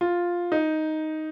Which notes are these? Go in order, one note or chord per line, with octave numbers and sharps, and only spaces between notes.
F4
D#4